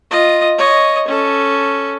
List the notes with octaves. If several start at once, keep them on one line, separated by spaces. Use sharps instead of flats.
F4 D#5
C#5 D#5
C#4 A4